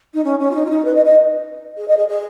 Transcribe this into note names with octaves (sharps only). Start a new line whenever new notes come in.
D#4
C#4
C#4
F4
D#4
F4
D#4
B4
D#5
D#5
G#4
D#5
G#4
G#4